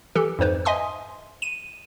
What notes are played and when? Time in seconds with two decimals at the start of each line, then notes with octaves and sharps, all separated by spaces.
0.15 E3 G4 A4
0.39 F2 G#2 B4 C5
0.65 D#5 E5 G#5 C6 D#6
1.42 D#7 E7